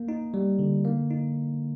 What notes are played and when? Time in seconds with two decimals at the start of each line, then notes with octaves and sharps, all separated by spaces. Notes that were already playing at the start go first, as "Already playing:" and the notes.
Already playing: A#3
0.09 D#4
0.34 G3
0.59 D3
0.85 A#3
1.11 D#4